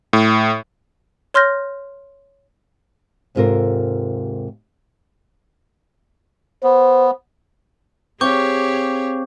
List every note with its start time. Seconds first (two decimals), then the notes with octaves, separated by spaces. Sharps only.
0.13 A2
1.34 C#5 C6 F6 G6 A#6
3.35 D#2 G#2 C3 F4 A4 A#4
6.63 B3 C5
8.21 C4 G4 G#4 C#5 F5 C#6 D6 G6